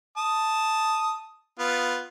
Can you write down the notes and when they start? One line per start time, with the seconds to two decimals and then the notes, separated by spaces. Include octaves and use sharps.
0.18 A5 D#6
1.59 B3 F4